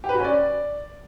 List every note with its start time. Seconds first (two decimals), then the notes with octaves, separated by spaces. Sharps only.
0.04 G4
0.09 B4
0.14 F#4
0.19 C#4
0.24 D5